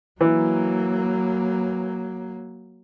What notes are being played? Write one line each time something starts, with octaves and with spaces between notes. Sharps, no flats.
E3 F#3 A#3